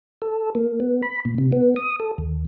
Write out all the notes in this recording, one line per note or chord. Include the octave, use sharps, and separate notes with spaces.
A4
A#3
B3
B5
A#2
C3
B3
D#6
A4
D#2